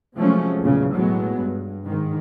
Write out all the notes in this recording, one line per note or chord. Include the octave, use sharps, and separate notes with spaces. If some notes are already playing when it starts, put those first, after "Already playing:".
C3 F3 F#3 G#3 A3 C#4
B1 E2 A#2 C#3
A2 F#3 G#3 B3
G2
G#2 D#3